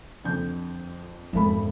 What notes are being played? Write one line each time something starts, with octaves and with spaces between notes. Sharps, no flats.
F2 D3 G6
E1 F2 G#2 A4 B5